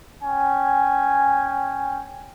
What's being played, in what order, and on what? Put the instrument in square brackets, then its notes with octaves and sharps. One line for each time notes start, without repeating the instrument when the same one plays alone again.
[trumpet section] C#4 G5 G#5